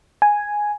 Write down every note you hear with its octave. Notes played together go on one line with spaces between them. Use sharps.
G#5